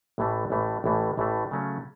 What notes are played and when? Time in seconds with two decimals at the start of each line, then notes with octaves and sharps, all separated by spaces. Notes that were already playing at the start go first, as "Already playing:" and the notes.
0.18 A1 A2 E3 A3
0.50 A1 A2 E3 A3
0.84 A1 A2 E3 A3
1.17 A1 A2 E3 A3
1.51 C#3 F#3 A3 C#4